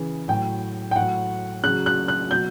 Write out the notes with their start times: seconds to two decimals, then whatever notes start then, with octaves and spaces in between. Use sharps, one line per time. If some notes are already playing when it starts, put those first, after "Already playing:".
Already playing: C#3 E3
0.28 A2 F#3 G5
0.91 G5
0.96 A2 F#3 F#5
1.63 C#3 F#6
1.67 F#3
1.86 F#6
2.08 F#6
2.31 B2 F#3 G6